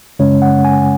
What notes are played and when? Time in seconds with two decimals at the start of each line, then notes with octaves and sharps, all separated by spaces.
0.19 F#2 C#3 G#3 C#4 C#5
0.42 F#5
0.65 G#5